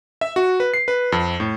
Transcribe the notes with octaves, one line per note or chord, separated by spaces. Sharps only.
E5
F#4
B4
C7
B4
F2
A2